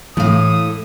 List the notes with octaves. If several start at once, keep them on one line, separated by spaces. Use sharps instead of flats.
A2 E3 A3 F5 D#6